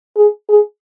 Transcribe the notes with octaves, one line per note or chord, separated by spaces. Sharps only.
G#4
G#4